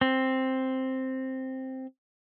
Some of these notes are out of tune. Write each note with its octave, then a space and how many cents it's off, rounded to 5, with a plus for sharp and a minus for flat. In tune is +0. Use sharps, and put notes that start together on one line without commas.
C4 +5